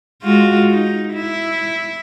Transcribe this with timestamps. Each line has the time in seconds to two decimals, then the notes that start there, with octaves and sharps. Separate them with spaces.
0.23 G#3 F4 F#4
0.71 D#4
1.13 E4